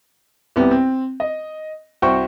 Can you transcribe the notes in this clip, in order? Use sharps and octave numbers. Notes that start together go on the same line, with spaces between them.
C2 B3 C4 G4
C4
D#5
C2 F#4 C5 G5 C#6